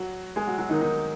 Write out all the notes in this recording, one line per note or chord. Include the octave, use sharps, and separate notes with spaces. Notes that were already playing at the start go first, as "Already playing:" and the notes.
Already playing: F#3 F#4
G#3 G#4
F#3 F#4
F#3 F#4
D#3 D#4
D#3 D#4